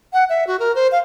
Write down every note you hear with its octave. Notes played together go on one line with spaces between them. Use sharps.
F#5
E5
F#4
A#4
C5
F5